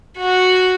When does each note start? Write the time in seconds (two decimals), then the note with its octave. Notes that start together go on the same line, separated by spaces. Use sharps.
0.18 F#4